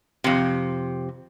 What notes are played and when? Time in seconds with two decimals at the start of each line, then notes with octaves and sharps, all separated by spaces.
0.24 F2 C3